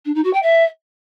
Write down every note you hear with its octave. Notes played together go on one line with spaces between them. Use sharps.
D4
D#4
F#4
G5
E5